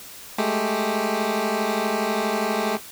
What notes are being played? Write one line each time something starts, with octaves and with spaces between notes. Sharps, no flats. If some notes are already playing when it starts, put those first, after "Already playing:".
G#3 A3 G4